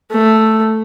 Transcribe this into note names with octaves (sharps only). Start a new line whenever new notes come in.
A3